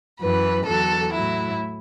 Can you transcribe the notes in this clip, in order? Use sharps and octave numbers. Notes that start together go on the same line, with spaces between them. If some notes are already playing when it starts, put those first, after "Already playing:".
F#2 E3 B4
E2 D3 F#3 A4
A2 F#3 E4